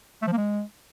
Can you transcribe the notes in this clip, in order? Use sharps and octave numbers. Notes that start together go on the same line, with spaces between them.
A3
F3
A#3
G#3